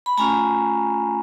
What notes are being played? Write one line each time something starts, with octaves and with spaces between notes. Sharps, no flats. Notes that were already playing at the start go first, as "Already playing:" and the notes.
B5
A3 C#4 F4 G#5 A#5